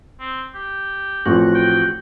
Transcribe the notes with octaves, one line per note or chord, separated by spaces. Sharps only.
C4
G4
A1 F3 C4 F#4
G5